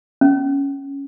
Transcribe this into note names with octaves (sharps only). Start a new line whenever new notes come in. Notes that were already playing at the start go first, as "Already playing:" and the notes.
C#4